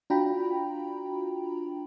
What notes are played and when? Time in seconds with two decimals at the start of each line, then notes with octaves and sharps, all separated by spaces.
0.10 D4 F4 F#4 G5 A#5 B5